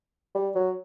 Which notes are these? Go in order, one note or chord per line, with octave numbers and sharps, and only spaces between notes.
G3
F#3